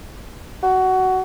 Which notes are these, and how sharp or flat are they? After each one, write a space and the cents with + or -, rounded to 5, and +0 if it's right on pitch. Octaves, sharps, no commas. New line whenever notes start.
F#4 +15